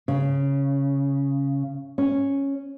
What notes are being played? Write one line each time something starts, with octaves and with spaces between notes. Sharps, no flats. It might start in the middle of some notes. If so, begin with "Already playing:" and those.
C#3
C#4